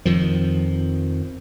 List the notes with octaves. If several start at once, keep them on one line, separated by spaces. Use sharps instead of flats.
F2 D#3 F3